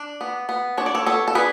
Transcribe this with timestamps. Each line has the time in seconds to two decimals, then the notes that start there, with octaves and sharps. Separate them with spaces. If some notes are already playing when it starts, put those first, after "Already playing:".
Already playing: D4
0.21 B3
0.49 B3
0.77 D4 C#5
0.86 D5
0.95 A4 C#5
1.06 B3 A4 C#5
1.28 A4
1.35 D4 G#4 B4